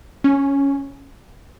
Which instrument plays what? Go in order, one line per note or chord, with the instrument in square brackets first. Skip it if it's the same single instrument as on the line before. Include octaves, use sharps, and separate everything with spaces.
[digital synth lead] C#4